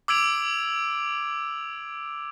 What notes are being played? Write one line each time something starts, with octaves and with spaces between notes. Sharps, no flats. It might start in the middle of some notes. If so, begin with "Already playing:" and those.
D6 E6 G#6 D7 F7